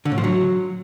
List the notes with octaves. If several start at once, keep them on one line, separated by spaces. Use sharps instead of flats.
D3
A2
F3
F#3